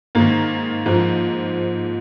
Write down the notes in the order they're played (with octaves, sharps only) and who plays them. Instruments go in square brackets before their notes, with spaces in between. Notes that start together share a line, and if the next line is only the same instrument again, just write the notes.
[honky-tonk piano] G#2 D#3 A#3
G#2 F3